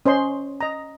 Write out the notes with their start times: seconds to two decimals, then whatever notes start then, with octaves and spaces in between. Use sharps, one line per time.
0.06 C#4 C5 D#5 C6
0.61 D#5 A#5